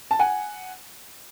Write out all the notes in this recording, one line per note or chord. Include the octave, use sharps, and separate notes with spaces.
A5
F#5 G#5